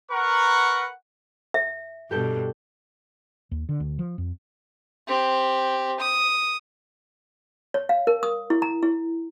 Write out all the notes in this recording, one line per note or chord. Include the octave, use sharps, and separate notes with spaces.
A#4 B4 F#5 A#5 C#6
E5
G2 B2 G4 A4 G6
D#2
D3
D2
F3
F2
C4 G4
D#6
C#5
F5
A#4
D#6
E4
A#5
E4